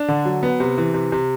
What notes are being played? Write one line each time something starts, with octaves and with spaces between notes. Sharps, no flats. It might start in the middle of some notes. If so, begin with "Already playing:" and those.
Already playing: D4
D3
F#3
B3
C3
E3
C3
C3